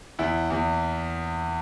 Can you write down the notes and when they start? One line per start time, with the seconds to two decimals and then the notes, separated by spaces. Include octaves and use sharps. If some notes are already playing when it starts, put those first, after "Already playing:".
0.19 E2 E4
0.50 E2